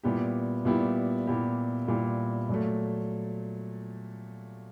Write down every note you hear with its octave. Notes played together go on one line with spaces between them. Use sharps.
A#2 G3 B3 E4 G4
A#2 G3 B3 E4 G4
A#2 G3 B3 E4 G4
A#2 G3 B3 E4 G4
A#2 F#3 A3